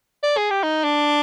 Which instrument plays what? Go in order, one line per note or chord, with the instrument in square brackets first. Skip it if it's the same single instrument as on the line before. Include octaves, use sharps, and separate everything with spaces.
[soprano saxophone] D5
G#4
G4
D#4
D4